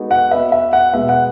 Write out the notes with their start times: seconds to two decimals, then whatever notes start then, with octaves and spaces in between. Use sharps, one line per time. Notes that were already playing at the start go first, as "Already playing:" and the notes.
Already playing: G#3 B3 D#4 F#4 A4
0.11 F#5
0.31 B3 F#4 B4 D#5 E5
0.52 E5
0.73 F#5
0.94 B2 G#3 B3 E5
1.09 F#5